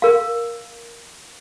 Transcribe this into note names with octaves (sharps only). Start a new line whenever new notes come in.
A#4 F5